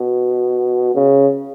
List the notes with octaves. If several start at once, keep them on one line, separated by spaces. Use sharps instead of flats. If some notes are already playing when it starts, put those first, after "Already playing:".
Already playing: B2
C#3